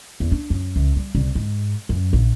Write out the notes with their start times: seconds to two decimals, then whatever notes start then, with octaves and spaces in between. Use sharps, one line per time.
0.20 E2
0.32 D4
0.50 F#2
0.76 C#2
0.96 G3
1.15 C2
1.35 G#2
1.89 F#2
2.13 A#1